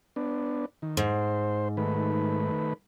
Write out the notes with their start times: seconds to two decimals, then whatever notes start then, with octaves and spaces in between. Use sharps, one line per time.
0.16 B3 D4
0.82 D#3
0.97 G#2 C5
1.77 D#3 A3 B4